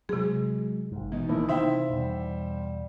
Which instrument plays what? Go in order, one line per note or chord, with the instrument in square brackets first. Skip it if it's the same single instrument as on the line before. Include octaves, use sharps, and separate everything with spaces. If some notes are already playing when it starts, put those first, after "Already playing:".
[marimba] C3 G#4 [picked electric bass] F#3 G#3
[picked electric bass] G#1 G#2
[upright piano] B2 D#4 [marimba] E3
[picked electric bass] A1 A3 A#3 [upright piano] E2 D#3 [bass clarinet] E4
[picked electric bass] C3 D#3 [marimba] D#4 G5 [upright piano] C5 E5 F5
[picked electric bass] E2 B2 [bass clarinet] G3